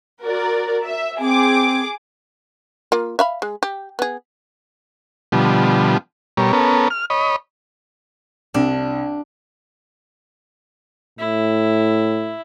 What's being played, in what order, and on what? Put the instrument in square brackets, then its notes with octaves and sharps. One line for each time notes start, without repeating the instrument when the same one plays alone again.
[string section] F#4 A#4 D5
E5
[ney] C4 [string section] G#4 D6
[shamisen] A#3 F4
E5 F5 B5
G#3
G4
B3 G#4
[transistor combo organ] B2 D3 F3 G3
B2 G3 A#4 C#5
B3 C#4 A4 A#4
F6
C#5 D#5 B5
[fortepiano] C2 [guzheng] D4
[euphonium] A2 [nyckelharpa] E4